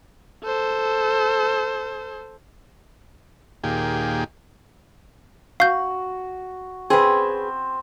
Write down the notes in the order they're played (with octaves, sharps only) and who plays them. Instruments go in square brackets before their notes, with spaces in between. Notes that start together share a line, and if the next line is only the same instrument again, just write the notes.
[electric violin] A4 C5
[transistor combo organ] D#2 A#2 G4 G#4
[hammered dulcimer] F#4 [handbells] F5 G6
[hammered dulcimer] C4 [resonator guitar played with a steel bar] G#4 B4